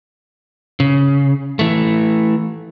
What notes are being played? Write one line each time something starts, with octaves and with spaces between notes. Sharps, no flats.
C#3
E3 A3